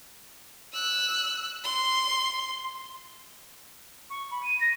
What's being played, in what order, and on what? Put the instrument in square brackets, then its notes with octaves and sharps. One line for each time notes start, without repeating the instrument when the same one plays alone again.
[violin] E6 F#6
C6
[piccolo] C#6
B5
D#7
A#6